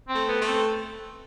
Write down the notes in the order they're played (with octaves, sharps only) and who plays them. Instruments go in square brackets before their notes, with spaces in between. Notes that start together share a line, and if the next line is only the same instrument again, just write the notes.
[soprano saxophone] C4
[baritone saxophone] A3
[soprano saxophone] B3
[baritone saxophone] A3
[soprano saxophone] C4